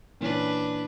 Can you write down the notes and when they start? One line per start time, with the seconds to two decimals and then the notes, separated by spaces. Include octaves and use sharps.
0.21 A#2 E3 C#4 D4 B4